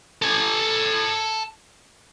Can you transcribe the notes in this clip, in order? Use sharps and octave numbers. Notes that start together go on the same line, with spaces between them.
A4 G#5